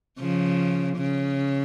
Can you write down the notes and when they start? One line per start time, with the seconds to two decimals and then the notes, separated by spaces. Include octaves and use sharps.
0.19 C#3 F3
0.97 C#3